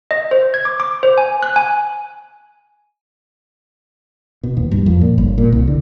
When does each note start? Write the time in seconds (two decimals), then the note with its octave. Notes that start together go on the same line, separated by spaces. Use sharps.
0.11 D#5
0.31 C5
0.54 G#6
0.65 D6
0.80 D6
1.03 C5
1.18 G#5
1.43 F#6
1.56 G#5
4.43 B2
4.57 D#2
4.71 G2
4.86 F2
5.01 A#2
5.18 G1
5.38 A#2
5.52 C2
5.67 D3